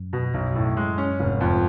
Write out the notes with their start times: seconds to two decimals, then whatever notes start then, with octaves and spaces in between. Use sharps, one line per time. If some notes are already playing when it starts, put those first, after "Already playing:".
Already playing: F#2
0.13 B2
0.34 B1 F#2
0.55 A2
0.77 G#3
0.98 C#4
1.19 F1 G#2
1.41 F2